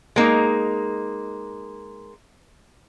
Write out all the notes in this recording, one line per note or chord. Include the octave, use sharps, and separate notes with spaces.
G#3 A#3 D#4